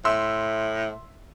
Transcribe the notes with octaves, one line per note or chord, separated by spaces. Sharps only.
A2 E5 C6 E6